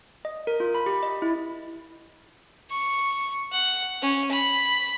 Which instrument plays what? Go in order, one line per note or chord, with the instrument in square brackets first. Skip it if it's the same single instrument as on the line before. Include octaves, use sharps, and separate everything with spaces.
[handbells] D#5
A#4
F4
B5
G4
D#5
E4
[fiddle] C#6
F#5
C#4
B5